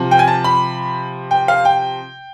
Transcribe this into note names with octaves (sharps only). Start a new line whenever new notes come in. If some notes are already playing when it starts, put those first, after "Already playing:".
Already playing: C3 F3
G5
G#5
A5
B5
G5
F5
G5